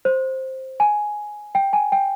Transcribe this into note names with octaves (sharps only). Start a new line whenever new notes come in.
C5
G#5
G5
G#5
G5